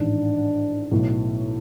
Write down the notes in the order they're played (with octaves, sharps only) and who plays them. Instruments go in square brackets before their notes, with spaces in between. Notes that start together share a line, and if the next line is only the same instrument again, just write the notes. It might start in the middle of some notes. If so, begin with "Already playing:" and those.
Already playing: [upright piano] A1 G#2 D#3 [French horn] D4
[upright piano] B1 A2 F#3